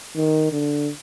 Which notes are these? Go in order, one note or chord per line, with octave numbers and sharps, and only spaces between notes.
D#3
D3